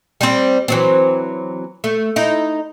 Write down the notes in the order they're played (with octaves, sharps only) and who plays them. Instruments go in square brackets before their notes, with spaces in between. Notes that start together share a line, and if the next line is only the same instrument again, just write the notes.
[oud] G3 C4
E3 F#3 C4
A3
D#4 E4